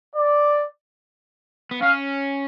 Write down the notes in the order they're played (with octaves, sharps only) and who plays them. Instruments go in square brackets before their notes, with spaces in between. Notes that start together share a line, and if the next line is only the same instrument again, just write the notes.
[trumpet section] D5
[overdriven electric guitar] B3
[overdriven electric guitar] C#4 [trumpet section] F5